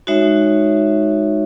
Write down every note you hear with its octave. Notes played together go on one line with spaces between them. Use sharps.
G#3 D#4 F#4 C#5 E5